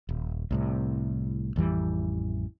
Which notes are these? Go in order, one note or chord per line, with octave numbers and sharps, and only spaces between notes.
D#1
C2 A2 C3
A1 F2 E3 G3